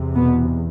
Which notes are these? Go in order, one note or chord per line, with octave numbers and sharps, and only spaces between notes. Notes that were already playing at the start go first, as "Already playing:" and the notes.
Already playing: E2 C3
B2 B3